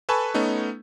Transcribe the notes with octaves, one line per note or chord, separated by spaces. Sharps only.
A4 B4 G#5 A5 B5 C#6
A3 B3 C#4 D#4